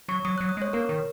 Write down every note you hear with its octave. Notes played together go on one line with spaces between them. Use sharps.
F#3 C#6
F#3 D#6
F#3 F#6
D#6
G#3 C#5
A#3 A#4
D#3